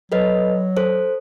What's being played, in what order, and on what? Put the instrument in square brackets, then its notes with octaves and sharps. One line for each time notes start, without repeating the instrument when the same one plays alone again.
[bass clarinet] F#3 [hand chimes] A4 B4 D#5
[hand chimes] A4 C5